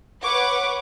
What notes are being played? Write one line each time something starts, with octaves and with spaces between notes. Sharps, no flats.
B4 C#5 F#5 C#6 D6